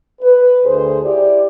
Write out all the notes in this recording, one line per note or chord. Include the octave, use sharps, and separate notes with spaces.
B4
D2 G#4 C5
E4 G4 D5